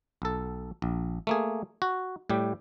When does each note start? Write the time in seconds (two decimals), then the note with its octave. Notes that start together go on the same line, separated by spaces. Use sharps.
0.22 B1 A4
0.82 A#1
1.27 A3 A#3 G#4
1.82 F#4
2.30 A2 G3 G4